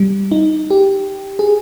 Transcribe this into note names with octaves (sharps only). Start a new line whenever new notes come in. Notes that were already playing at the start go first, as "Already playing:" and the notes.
Already playing: G3
D#4
G4
G#4